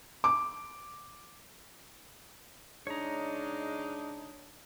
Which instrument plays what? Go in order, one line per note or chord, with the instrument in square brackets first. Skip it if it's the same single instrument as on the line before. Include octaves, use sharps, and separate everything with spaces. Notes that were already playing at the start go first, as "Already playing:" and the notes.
[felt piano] D6
[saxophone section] C#3 G#3 D#4 [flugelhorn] D4 [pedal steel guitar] C#5 A#5